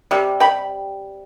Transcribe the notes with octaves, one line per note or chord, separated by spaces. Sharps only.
C3 G3
G5 B5